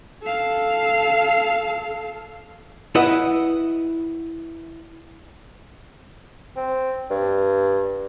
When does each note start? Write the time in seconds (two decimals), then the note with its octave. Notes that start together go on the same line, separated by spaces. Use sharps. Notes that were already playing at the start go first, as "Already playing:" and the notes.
0.23 A4 F5
2.95 E4 B4 D#5 E5 F#5
6.56 C4
7.10 G2